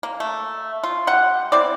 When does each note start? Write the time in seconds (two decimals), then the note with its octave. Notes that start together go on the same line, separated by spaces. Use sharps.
0.03 A#3
0.20 A3
0.84 F4
1.07 G3 F#5
1.52 C4 E4 D5